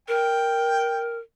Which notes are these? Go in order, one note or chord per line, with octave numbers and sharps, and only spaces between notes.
A#4 G5